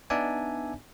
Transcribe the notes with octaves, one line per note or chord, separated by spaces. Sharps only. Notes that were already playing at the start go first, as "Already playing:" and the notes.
B3 D4 D#4 D5 E5 G#5